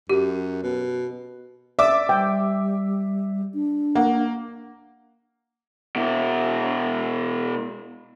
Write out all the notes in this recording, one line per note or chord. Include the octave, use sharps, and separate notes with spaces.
F#2 G4
B2
D5 E5 D6 E6
G3 G5
D4
A#3 F#5
B2 E4